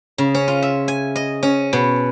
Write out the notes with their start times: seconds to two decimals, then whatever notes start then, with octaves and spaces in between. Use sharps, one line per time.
0.18 C#3
0.35 C#4
0.48 F4
0.62 E5
0.88 G#5
1.16 D#5
1.43 C#4
1.73 B2